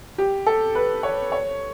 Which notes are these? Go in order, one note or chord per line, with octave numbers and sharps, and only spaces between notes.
G4
A4
B4
C#5
C#5